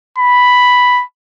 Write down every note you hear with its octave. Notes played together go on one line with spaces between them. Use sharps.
B5